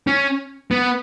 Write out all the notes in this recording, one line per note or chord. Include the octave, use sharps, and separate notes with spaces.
C#4
B3